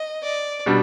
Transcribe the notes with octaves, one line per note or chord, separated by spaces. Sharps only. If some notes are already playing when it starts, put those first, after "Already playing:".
Already playing: D#5
D5
B2 G3 D4